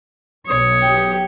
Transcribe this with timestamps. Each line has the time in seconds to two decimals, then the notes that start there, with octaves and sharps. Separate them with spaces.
0.47 B1 C#5 D#6
0.81 G4 G5